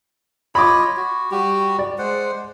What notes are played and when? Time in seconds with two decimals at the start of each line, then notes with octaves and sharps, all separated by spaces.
0.55 F4 C#5 D#5 B5 D6
0.97 F#4
1.31 G3 F#4 G4
1.79 D5
1.98 G#3 C5 F#5